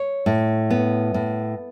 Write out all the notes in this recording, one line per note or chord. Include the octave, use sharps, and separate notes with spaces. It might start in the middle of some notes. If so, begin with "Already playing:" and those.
Already playing: C#5
A2
B3
A2